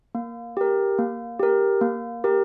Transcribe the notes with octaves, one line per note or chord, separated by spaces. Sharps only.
A#3
G4 A#4
A#3
G4 A#4
A#3
G4 A#4